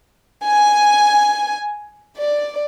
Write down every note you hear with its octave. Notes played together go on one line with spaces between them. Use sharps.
G#5
D5